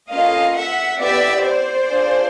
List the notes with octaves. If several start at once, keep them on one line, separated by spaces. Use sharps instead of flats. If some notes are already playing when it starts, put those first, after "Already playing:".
A#3 C#4 F4 A4 D#5 F5
E5 F#5
B3 E4 G4 D5 E5
C5 D5
D4 F4 G#4